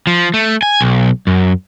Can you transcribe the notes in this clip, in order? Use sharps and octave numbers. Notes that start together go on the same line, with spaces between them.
F3
A3
G#5
B1
F#2